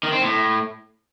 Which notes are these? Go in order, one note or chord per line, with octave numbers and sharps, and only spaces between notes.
D#3
C4
A2